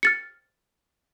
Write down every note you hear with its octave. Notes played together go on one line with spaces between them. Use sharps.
F6 A6 C#7